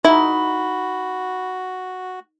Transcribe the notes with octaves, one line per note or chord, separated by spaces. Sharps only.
D#4 E4 F#4 B5